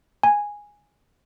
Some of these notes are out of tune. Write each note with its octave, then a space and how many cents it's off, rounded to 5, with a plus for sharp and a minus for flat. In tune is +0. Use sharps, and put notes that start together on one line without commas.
G#5 -10